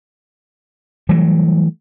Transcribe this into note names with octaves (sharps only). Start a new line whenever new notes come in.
E3 F#3 G3 A3